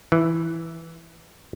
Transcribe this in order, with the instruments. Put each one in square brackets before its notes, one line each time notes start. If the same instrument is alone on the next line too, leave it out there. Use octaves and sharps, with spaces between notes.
[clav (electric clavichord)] E3